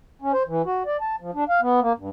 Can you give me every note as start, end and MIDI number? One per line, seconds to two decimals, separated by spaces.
0.22 0.32 61
0.33 0.43 72
0.48 0.62 52
0.66 0.83 66
0.86 0.97 74
1.01 1.16 81
1.20 1.31 53
1.34 1.44 62
1.49 1.60 77
1.61 1.80 59
1.82 1.93 58
1.98 2.10 43